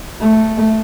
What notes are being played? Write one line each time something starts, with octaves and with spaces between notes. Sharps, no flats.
A3